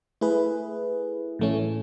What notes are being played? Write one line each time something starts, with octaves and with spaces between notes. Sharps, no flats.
A3 E4 G#4 B4
A2 E3 A3 C#4